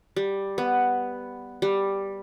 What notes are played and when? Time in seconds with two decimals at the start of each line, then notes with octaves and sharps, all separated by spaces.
0.16 G3
0.58 B3
1.62 G3